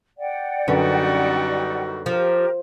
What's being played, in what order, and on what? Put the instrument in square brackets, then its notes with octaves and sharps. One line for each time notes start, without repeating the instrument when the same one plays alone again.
[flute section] D5 F#5 G5
[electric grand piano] F#2 D3 B4 [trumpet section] G3 D#4 F#4 [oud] C#4
[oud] F3 [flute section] G4 A#4